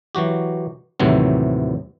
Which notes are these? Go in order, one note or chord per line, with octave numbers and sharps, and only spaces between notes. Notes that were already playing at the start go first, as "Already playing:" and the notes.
E3 F#3 F#4 G4
D#2 A2 C3 E3 F#3 C4